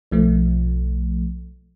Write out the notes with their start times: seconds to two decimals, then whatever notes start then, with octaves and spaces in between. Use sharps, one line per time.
0.11 B1 F3 A3